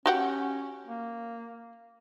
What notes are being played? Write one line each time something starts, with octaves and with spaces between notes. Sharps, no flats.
C#4 F#4 G4 F#5
A#3